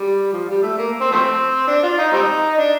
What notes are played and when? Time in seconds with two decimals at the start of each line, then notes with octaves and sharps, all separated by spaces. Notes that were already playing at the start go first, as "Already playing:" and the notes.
Already playing: G3
0.32 F3
0.48 G3
0.62 A3
0.78 A#3
1.00 C4
1.11 F3 A3 C4
1.67 D4
1.83 F4
1.98 D#4
2.12 G3 C4 D#4
2.58 D4